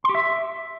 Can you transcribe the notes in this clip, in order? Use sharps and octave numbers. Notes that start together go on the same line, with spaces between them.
C6
G4
E5